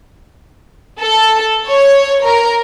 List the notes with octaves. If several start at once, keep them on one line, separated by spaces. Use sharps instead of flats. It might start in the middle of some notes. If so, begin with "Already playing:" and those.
A4
C#5
A#4